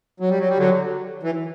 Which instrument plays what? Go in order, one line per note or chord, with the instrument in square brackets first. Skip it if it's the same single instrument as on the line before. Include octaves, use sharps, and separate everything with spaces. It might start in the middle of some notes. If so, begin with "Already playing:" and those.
[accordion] F#3
G3
F#3
G3
D3 F#3
E3